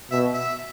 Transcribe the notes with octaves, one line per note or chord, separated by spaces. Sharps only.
B2 E5
E5